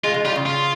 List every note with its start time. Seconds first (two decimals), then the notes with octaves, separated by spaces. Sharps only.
0.04 G#3 F4
0.14 G#3
0.25 G3 F4
0.36 C#3
0.46 F4